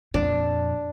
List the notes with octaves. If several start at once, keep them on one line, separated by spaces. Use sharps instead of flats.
F2 A#2 D4